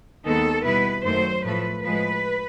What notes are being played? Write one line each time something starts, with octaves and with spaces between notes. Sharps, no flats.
D#2 D#3 G#3 B3 D#4 A4
B2 G3 B3 E4 B4
F#2 D#3 F#3 A3 C5
A2 F3 A3 B4
A2 F3 G#3 B4